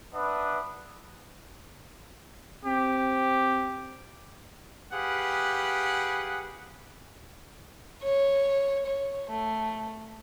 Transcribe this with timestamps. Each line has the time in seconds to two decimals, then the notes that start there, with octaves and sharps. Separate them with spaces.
0.14 D4 B4 E5 F#5 D#6
2.65 C4 G4
4.92 G4 G#4 B4 F5 F#5
8.03 C#5
8.86 C#5
9.30 A3